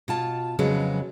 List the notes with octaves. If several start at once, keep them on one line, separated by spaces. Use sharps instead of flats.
B2 F4 A5
F2 C#3 F#3 G#3 B3